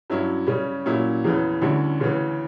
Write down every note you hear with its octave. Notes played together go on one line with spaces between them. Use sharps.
G2 F#3 C#4 E4
C#3 G3 C#4
A#2 F#3 C#4 E4
E2 C#3 E3
D2 D3 G3 C#4 E4
D2 C#3 E3